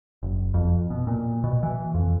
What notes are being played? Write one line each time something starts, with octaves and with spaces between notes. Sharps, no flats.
F#1
F2
B2
A#2
B2
E3
F2